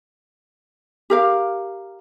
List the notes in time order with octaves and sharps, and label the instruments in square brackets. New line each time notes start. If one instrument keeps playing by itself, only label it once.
[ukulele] G4 A#4 F5